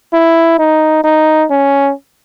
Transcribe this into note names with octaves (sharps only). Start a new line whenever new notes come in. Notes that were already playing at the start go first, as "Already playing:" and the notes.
E4
D#4
D#4
C#4